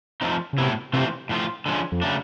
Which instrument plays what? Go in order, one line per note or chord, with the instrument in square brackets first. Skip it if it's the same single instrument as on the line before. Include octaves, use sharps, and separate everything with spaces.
[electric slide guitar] F3 A3 C4 D#4
[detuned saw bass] C#3
[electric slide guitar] A2 F#3 B3 E4 [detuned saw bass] C3
[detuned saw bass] C3 [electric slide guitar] E3 A3 C4 F4
[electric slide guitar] A2 F3 A3 D4 F4
D3 F3 G#3 C#4
[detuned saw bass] F2
[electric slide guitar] C#3 F#3 A3 D4